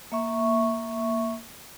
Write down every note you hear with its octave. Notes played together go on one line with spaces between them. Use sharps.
A#3 E5 C#6